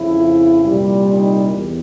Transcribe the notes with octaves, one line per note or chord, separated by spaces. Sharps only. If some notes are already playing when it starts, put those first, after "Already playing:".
Already playing: F2 C#3 F3 E4
C2 A#2 G3
D#4
E2